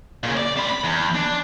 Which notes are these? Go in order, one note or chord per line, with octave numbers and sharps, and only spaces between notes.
A#2 C#3
D5
C4 B5
B5
E2
D4